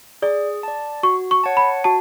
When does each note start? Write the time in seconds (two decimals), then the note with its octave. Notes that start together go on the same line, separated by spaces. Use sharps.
0.22 G#4 D5
0.63 D5 A5
1.03 F#4 C#6
1.31 C#6
1.44 C#5 F#5 A5
1.57 B5
1.84 F#4 A5